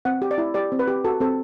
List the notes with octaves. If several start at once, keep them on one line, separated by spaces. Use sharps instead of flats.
C4 F#5
G4
D5
E4
G4 D5
C4
B4
G4
F#4 A4
C4 A4